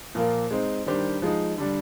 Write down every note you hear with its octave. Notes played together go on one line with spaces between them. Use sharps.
A#2 F3 A#3 F4 A#4
G#3 C4 D#4
D#3 G3 D4 G4 C5
F3 G#3 D#4
D3 G3 D4